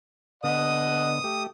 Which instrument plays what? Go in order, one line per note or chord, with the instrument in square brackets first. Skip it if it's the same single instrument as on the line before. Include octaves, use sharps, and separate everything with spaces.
[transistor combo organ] D3 B3 [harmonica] D#5 F#5 [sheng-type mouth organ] D#6
[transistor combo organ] A3 G4